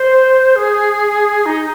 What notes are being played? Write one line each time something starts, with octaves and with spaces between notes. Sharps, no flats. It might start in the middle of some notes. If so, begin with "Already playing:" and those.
Already playing: C5
G#4
D#4